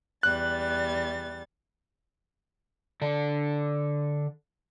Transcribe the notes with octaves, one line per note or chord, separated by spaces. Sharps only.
E2 G3 F#6 A6
D3 D4